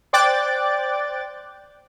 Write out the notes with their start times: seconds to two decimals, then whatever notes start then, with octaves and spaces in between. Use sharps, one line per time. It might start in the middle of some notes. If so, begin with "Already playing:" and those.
0.13 C5 D5 G5 D6 F#6 A6